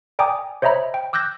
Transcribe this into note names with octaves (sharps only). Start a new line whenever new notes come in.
D5 G5 G#5 A#5 D6 D#6
C5 C#5 D#5 E5 A#5 B5
G5
D6 E6 F#6 G6 A#6